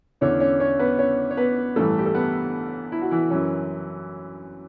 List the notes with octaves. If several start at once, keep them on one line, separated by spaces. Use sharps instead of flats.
E2 D3 C#4 C#5
C#4 C#5
C#4 C#5
B3 B4
C#4 C#5
C#5
B3 B4
A1 G2 E3 A3 A4
G4
A4
B3 B4
E4
F#4
E3 E4
F#2 E3 C#4